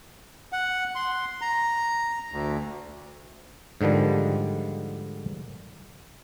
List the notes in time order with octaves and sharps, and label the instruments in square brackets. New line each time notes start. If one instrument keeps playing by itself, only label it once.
[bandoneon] F#5
C6
A#5
D2
[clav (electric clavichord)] G#2 D3 D#3 F3 G3